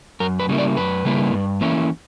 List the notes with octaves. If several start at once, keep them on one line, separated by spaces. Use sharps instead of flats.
F#2 A#4
B4
C#3 G3 A#3 E4
D5
F#2 B4
C#3 G3 A#3 E4
G2
E3 A#3 C#4 E4